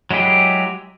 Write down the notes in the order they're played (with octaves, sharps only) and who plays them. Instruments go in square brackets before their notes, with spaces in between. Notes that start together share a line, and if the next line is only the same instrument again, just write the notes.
[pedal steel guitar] F#3 G#3 E4 G4 G#4